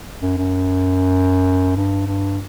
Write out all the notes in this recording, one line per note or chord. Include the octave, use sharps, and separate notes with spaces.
F#2
F#2
G2
G2